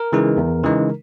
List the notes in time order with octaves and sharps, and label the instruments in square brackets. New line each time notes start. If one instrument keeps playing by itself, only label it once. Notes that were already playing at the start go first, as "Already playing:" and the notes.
Already playing: [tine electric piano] A#4
C#3 E3 G#3 D#4
E2
C#3 E3 G#3 D#4